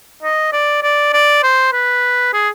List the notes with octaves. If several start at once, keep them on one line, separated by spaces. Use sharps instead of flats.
D#5
D5
D5
D5
C5
B4
G#4